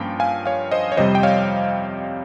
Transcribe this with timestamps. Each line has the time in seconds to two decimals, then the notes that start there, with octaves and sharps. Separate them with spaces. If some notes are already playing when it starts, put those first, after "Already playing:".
Already playing: G2 F3 A#3 C#4 G5
0.20 F5 G#5
0.45 C#5 F5
0.71 C5 D#5
0.92 C#5
0.97 F2 C3 G3 C5 D#5
1.15 G5
1.23 C#5 F5